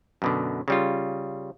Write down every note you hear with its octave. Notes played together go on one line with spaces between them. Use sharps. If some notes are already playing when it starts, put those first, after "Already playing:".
F#2 B2 D3
C#3 G3 F4